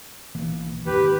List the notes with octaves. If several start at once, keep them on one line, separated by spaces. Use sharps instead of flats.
B1 E3 A#3
D#2 G#2 G4 B4